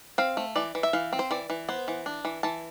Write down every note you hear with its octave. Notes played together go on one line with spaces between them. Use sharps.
C4 F5
A3
E3 D5
E3
E5
E3 F5
C4
C5
E3 D5
E3
B3 C5
E3
D4
E3
E3 A5